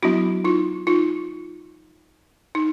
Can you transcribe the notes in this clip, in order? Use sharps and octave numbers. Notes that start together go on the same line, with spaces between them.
F#3 B3 D4 E4 F#4
D#4 F4
D#4 F4
D#4